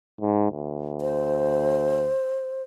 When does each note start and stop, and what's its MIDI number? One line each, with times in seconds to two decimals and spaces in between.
0.21 0.51 44
0.51 2.11 38
1.01 2.63 72